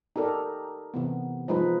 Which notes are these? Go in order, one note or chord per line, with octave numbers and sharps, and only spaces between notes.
D#4 G4 A4 A#4 D5
C3 E3 B3
F3 G#3 D#4 B4